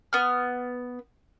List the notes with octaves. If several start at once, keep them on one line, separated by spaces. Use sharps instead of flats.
B3 F6